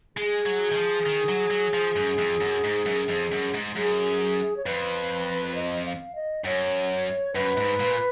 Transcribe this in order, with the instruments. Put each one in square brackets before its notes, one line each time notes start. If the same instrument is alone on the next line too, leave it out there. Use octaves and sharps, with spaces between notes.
[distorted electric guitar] G#3 [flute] G#4
[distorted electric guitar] F#3
D#3
F3
D#3
F#3
F#3
F3
F#2
F2
F#2
G#2
F#2
F2
F#2
G#2
[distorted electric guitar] F#2 [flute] G#4
[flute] C#5
[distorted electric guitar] F2 [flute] B4
[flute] D#5
F5
D#5
[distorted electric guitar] F#2 [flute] C#5
[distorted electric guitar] F#2 [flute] B4
[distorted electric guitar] G#2
A#2